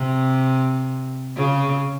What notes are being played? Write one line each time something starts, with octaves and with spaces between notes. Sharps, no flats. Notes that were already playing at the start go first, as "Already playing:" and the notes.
Already playing: C3
C#3